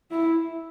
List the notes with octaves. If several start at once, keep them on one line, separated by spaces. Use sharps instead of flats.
E4